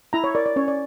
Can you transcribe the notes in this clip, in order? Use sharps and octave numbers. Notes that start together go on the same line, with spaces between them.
E4 A#5
C#5
A#4 D5
D5
C#4 C#5
D5